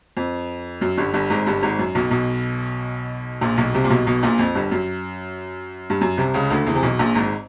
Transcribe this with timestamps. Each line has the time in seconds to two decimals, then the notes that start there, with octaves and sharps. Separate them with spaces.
0.17 F2
0.81 F#2
0.97 G1 G2
1.14 G1 G2
1.30 G#1 G#2
1.46 G1 G2
1.63 G#1 G#2
1.79 F#2
1.95 B1 B2
2.11 B1 B2
3.41 A#1 A#2
3.57 B1 B2
3.74 C2 C3
3.84 A#2
3.90 B1 B2
4.06 B1 B2
4.23 A#1 A#2
4.39 F2
4.55 G1 G2
4.72 F#2
5.90 G2
6.01 F#2
6.17 C2 C3
6.34 C#2 C#3
6.50 D2 D3
6.66 E2 E3
6.75 C3
6.83 B1 B2
6.99 A#1 A#2
7.15 G#1 G#2